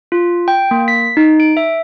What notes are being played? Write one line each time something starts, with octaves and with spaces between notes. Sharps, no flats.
F4
G5
A#3
B6
D#4
D7
E5